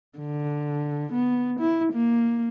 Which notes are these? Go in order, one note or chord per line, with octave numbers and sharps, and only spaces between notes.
D3
B3
E4
A#3